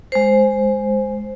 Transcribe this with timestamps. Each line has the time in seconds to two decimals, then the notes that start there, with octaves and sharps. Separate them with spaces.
0.12 G#3 C5